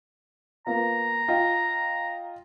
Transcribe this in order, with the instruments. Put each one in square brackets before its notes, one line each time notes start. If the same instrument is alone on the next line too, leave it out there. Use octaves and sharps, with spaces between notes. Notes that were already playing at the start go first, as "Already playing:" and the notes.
[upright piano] A#3 B3 F4 [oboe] A#5
[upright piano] F4 D#5 G5